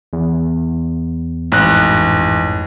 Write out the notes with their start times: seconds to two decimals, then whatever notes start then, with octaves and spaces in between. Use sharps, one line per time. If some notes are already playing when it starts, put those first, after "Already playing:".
0.13 E2
1.52 A1 F2 G#2 F#6